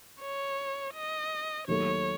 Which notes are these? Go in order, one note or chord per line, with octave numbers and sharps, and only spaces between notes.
C#5
D#5
D#2 D#3 F#3 A3 C#5